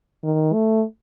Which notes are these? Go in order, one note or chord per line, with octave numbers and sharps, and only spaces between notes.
D#3
A3